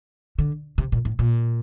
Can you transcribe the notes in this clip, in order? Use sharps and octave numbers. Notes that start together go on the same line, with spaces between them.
D3
C3
A#2
A2
A#2